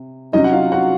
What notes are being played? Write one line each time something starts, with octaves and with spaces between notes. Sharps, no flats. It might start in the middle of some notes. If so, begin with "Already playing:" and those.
Already playing: C3
C3 F#3 C#4 D#4 D#5
F#5
F4 F5
F#4 F#5